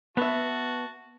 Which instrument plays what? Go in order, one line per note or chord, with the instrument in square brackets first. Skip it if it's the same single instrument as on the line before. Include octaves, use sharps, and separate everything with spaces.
[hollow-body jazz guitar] B3 [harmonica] F#4 A5 [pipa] B4 E5